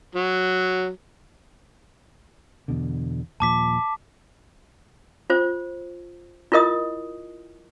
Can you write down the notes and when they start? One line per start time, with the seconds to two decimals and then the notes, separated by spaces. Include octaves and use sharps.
0.15 F#3
2.68 E2 B2 D3
3.40 D#1 A#2 F3 A5 D6 B6
5.30 F4 C5
6.52 E4 F4 A#4 D#5 D#6